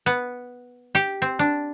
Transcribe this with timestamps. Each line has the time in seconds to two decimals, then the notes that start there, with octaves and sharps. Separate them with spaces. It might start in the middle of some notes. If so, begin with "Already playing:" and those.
0.06 B3
0.95 G4
1.22 C4
1.39 D4